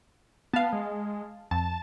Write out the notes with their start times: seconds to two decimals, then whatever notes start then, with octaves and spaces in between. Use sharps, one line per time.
0.53 B3 F5 A5
0.72 G#3
1.51 F2 A5